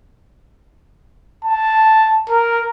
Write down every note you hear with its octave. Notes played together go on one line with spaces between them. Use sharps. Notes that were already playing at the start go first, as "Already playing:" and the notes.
A5
A#4